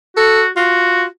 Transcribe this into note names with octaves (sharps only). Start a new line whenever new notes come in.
F#4 A4
F4 F#4